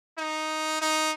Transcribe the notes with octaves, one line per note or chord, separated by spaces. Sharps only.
D#4
D#4